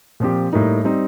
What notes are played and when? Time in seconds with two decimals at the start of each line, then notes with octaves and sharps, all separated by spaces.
0.20 A#2 F3 C4 G4
0.53 A2 G3 A#3 D#4
0.84 G3 C4 D#4